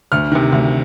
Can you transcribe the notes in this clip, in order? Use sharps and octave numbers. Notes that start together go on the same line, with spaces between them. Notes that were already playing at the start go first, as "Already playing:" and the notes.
D2 F6
C3 D#3
D2